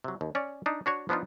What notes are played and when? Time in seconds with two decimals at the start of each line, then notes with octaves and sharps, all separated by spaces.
0.04 C3 F#3
0.21 D#2
0.35 C#4 C#5 D5
0.66 D4 D#4
0.86 D4 F#4 C#5
1.09 F3 B3 D4 D#4 F4